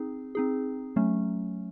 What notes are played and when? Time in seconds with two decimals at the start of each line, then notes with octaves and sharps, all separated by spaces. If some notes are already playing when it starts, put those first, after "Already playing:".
Already playing: C4 D#4 G#4
0.35 C4 D#4 G#4
0.96 F#3 A3 C#4